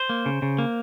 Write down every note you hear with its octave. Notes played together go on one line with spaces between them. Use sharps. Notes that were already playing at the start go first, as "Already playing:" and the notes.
Already playing: C5
A#3
C#3
C#3
A#3